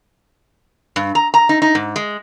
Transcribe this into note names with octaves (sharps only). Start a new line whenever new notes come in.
G2
A#5
A#5
D#4
D#4
G#2
G#3